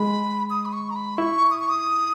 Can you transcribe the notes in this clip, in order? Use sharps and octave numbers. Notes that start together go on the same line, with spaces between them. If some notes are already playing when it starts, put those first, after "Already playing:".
Already playing: G#3 B5
D#6
B5
C#6
A#5
B5
E4 C#6
D#6
C#6
D#6